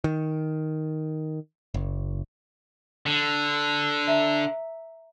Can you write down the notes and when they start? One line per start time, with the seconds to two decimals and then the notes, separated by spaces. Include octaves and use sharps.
0.04 D#3
1.74 F#1
3.06 D3
4.07 E5 A#5